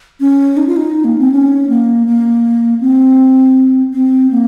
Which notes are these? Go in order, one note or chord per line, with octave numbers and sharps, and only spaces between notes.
C#4
D#4
F4
D#4
A#3
C4
C#4
A#3
A#3
C4
C4
A#3